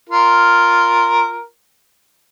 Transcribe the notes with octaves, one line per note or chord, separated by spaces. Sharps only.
F4 A#4